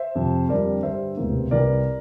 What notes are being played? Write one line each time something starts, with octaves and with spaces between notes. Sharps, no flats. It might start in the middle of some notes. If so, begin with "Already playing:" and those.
Already playing: C5 E5
F2 C3 F3
F2 D3 G3 A#4 D5
G2 D3 G3 C5 E5
E1 D2 C3 E3 A#3
C2 C3 E3 G3 A#4 D5